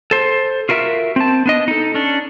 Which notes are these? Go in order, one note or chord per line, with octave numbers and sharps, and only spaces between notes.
A4 C5
F4 F#4 A#4 E5
C4 A5
B3 D4 D#5
D#4 A4
C#4 D4